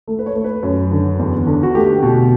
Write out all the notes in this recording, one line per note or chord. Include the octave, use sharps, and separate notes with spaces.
A3
B4
C#5
A3
B4
F#2
D3
E2
D3
F#4
A3 G4
B2